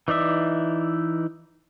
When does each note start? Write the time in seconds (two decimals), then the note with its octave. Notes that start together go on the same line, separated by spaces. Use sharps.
0.08 E3 D#4 D5 E5